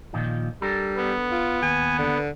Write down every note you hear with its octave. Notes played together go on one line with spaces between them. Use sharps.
A#2 D#3 F3
G3 D4 A4 A#4
B3
F4
D#2 G#5
D3